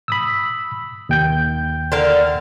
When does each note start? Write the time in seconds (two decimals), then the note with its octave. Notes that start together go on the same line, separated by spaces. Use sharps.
0.08 B5 D#6 E6
1.09 D#2 G5 G6
1.92 D3 A#4 F5